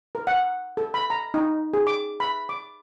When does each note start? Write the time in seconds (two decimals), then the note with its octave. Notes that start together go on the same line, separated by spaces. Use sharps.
0.15 A#4
0.27 F#5
0.77 A4
0.94 B5
1.10 A#5
1.34 D#4
1.74 G#4
1.87 D6
2.20 B5
2.49 D6